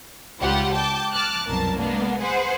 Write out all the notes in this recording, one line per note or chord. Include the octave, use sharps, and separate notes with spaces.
C#2 G3 F4 G4 F#5
G5 A5 D6 G6
A5 D6 F6 F#6
C2 F#2 B2 A#4 A5
G#3 A#3 B3 D4
G#4 B4 C5 F#5